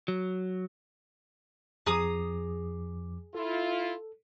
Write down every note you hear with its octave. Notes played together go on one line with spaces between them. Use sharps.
F#3
F2 F3 G#4 A#5 D6 D#6
E4 F4 A4